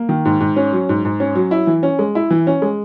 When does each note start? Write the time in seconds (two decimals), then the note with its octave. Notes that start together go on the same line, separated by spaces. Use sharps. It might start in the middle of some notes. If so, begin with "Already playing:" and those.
Already playing: A#3
0.09 D#3
0.25 G#2
0.40 G#2
0.56 C#4
0.73 F#3
0.89 G#2
1.05 G#2
1.20 C#4
1.35 F#3
1.51 E4
1.67 E3
1.83 C#4
1.99 G#3
2.15 E4
2.31 E3
2.47 C#4
2.62 G#3